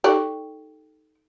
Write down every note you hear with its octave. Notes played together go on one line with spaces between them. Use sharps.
D#4 G4 A4 D5 C#6